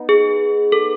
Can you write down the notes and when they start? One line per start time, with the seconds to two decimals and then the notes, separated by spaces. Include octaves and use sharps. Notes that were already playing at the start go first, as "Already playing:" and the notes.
Already playing: B3 D#4
0.09 G#4
0.72 A4